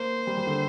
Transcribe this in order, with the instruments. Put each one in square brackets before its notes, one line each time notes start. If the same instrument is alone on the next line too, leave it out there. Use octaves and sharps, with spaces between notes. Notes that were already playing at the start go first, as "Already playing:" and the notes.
Already playing: [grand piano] A#3 [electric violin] C5
[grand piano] G3
G3
D3